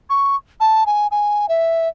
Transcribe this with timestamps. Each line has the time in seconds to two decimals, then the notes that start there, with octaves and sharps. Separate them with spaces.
0.10 C#6
0.60 A5
0.86 G#5
1.11 G#5
1.49 E5